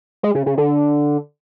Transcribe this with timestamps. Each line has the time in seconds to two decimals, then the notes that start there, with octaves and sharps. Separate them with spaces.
0.23 G#3
0.35 C#3
0.46 C#3
0.57 D3